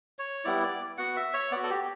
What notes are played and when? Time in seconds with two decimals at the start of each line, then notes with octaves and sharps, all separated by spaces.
0.19 C#5
0.44 G3 B3 E4 D5
0.63 D5
0.98 B3 F#4 F#5
1.16 E5
1.34 C#5
1.52 B3 F#4 D5
1.63 A4
1.70 G4